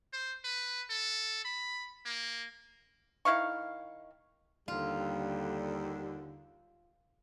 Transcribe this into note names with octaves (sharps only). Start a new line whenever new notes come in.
C5
B4
A4
B5
A#3
D#3 E4 F5 C#6
D#2 D3 G3 F4